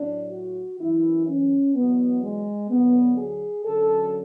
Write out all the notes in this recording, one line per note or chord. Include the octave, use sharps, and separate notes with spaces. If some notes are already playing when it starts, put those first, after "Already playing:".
Already playing: A2 F#3 D4
F#4
F#2 E3 E4
C#4
E2 B2 F#3 B3
G#3
D2 D3 F#3 B3
G#4
F#2 D3 F#3 A4